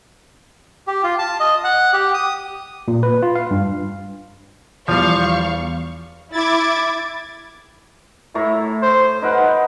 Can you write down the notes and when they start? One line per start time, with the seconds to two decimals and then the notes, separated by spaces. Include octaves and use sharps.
0.87 G4
1.04 F4
1.19 A5
1.40 D#5
1.64 F#5
1.93 G4
2.14 D#6
2.88 A#2
3.03 B4
3.23 F4
3.35 F5
3.51 G2
4.88 E2 F3 G3 F5 C#6
6.32 E4 D6 G#6 A6
8.35 A2 E4 C#5 A#5
8.82 C5
9.22 D#4 A#4 B4 F#5